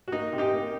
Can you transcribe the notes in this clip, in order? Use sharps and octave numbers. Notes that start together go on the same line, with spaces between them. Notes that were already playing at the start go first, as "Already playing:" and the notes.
F#4
A#3 D#4
C3
D#4 G4
A#3